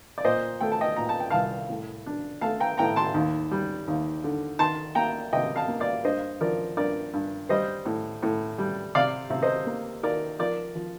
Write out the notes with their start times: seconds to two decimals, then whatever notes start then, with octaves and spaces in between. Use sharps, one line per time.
0.18 D5
0.25 A#2 C5 D#5
0.61 A3 G5
0.72 A5
0.81 D#5 G5
0.96 A#2 A#5
1.09 A5
1.20 G5
1.31 C2 F5 A5
1.69 A2
2.06 D4
2.41 A3 F5 A5
2.60 G5 A#5
2.78 A2 G5 A#5
2.96 A5 C6
3.14 D#2
3.51 G3
3.87 D#2
4.24 D3
4.59 D#3 A5 C6
4.95 A#3 G5 A#5
5.33 C3 D#5 G5
5.56 F5 A5
5.68 A#3
5.80 D5 F5
6.04 G2 C5 D#5
6.41 F3 A#4 D5
6.77 G2 A#4 D5
7.13 G2
7.49 G3 C5 D#5
7.85 A2
8.22 A2
8.58 G3
8.95 C3 D5 F5
9.30 C3
9.42 C5 D#5
9.66 A#3
10.03 D#3 A#4 D5
10.39 F3 A#4 D5
10.75 F3